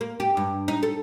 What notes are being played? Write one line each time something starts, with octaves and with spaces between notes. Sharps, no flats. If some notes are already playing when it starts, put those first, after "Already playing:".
A#3
G4
G2
D#4
A4